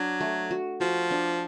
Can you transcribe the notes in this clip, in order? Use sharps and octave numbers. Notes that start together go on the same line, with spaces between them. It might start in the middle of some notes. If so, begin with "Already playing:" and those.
Already playing: F#3 D4
A3
F#4
F3 F#4
D4